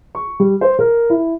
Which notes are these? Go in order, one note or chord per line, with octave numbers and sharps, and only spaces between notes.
C#6
G3
C5
A#4
E4